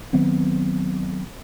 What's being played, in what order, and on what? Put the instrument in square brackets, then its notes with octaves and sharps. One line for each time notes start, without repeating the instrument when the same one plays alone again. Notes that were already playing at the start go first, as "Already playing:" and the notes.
[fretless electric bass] D#3 F#3 B3 C4